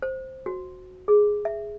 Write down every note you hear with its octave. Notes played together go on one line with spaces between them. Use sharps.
C5
F#4
G#4
E5